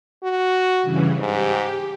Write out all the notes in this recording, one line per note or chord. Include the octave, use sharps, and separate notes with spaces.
F#4
G2 C#3 E3
G#2 G4